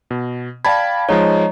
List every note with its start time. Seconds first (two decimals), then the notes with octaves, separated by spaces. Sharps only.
0.11 B2
0.65 D5 F5 G5 A5 B5 G#6
1.09 F3 G#3 D#4 C#5 D#5 A#5